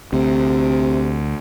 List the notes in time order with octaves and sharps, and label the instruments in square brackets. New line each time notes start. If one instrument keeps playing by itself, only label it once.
[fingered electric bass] D2 [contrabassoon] C3